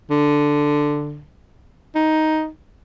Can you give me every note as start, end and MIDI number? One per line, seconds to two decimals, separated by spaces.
0.10 1.24 50
1.95 2.48 63